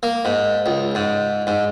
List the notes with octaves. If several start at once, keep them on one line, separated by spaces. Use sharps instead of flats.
A#3
G#2
C#2
G#2
G#2